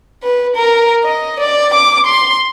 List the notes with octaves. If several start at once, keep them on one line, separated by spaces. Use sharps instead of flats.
B4
A#4
D#5
D5
D6
C6